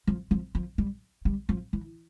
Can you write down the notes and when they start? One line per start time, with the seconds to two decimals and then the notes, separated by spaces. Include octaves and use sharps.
0.07 F3
0.31 F3
0.55 F3
0.78 G3
1.25 G3
1.49 F3
1.73 E3